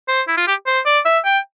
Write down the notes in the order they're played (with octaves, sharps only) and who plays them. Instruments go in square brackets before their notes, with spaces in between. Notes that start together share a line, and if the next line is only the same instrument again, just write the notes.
[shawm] C5
E4
F4
G4
C5
D5
E5
G5